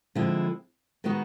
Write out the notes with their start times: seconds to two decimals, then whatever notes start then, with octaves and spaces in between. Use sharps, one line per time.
0.15 D3 F3 G#3 C4 E4
1.04 D#3 G#3 B3 D#4 F#4